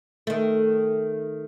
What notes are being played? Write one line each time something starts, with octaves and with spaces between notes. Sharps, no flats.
D#3 A3